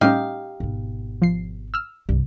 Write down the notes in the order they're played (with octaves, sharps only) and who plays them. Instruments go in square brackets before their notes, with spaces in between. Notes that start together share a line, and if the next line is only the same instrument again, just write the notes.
[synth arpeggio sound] A2 G3 C#4 [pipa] D#4 G4 F5
[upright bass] G#1 B2
[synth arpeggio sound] F3 C7
E6 F6
[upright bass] C2 [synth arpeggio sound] G2